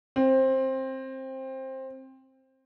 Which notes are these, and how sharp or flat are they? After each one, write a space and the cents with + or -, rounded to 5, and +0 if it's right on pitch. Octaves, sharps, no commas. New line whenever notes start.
C4 +15